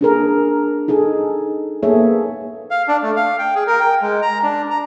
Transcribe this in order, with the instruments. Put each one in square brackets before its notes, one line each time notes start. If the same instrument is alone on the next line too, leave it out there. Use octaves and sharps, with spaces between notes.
[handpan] D4 G#4 A#4
D#4 G#4 A4
A#3 B3 G#4 A4 C#5 E5
[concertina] F5
D4
A3
F5
G5
G#4
A#4
G5
G#3
A#5
D4
A#5